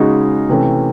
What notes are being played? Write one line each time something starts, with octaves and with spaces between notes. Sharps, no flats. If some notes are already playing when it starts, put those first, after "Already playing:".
Already playing: C#3 G#3 D#4 F#4
C3 E3 A3 C#4